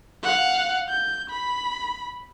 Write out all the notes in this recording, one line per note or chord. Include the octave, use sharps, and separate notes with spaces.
F5 F#5
G6
B5